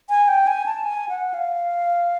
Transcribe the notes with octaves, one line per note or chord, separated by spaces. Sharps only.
G#5
G5
G#5
A5
G#5
F#5
F5